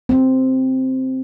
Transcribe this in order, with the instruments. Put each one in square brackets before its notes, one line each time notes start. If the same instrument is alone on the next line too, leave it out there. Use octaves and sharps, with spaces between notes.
[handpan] C4